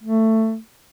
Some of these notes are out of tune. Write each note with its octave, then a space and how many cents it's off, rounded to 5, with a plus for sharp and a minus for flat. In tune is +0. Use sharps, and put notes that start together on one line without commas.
A3 +15